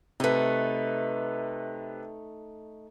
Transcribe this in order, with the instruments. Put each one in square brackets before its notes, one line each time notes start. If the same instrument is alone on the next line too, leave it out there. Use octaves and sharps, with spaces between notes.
[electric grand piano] C3 B4 [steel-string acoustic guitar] A3 D#4